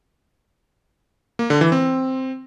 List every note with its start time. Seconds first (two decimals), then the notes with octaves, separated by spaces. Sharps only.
1.39 A#3
1.50 D3
1.61 E3
1.72 C4